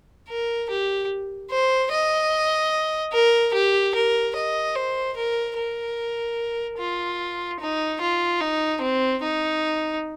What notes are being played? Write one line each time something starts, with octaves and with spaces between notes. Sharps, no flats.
A#4
G4
C5
D#5
A#4
G4
A#4
D#5
C5
A#4
A#4
F4
D#4
F4
D#4
C4
D#4